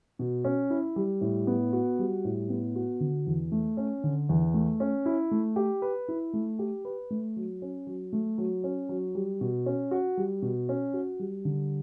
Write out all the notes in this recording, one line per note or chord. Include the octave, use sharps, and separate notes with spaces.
B2
C#4
E4
G3
A2
B3
F#4
G3
A2
B3
F#4
D3
E2
A3
C#4
D3
E2
A3
C#4
E4
A3
G4
B4
E4
A3
G4
B4
A3
F#3
C#4
F#3
A3
F#3
C#4
F#3
G3
B2
C#4
F#4
G3
B2
C#4
F#4
G3
D3